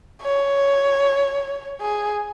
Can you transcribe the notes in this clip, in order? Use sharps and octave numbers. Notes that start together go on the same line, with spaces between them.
C#5
G#4